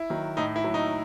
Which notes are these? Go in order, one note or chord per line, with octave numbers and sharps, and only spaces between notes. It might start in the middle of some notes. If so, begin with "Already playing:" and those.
Already playing: E4
D#3 F#3
A2 D#4
E4
F#3
D#4